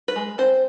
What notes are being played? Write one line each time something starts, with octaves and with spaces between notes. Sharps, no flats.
B4
G#3
C4 C5